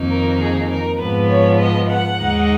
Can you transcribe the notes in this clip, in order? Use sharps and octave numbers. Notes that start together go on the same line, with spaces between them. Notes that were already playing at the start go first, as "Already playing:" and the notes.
Already playing: F2 D#3 A#3 D#4
A#4
G#4
A#4
G#2 F3 B3 B4
C#5
D#5
F#5
D#2 D#3 G#3 D#4